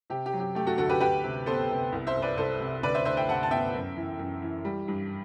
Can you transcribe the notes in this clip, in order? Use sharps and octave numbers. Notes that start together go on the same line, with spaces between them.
C3 G4
G4
F#3
G4
A3 G4
F#4 A4
D2 F#4 A4
G4 B4
D2 G4 B4
C3
B3 A4 C5
C3
C2
C5 E5
C2
B4 D5
C2 A4 C5
C3
D2 B4 D5
C5 E5
D2 C5 E5
E5 G5
C3 F#5 A5
A5
B3 E5 G5
F#2
E3
F#2
E3
G3
G2